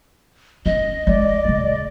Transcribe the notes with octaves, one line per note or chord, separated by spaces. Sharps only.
C#4 D#5
G#3 D4 D5
D#1 C#3